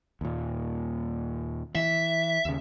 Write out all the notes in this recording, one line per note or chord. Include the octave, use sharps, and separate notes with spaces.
D#2 A#2
E3 E5
D#2 C#3